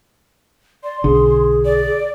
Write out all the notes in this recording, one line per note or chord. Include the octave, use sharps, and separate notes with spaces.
D5 C6
B1 D3 G#4
D5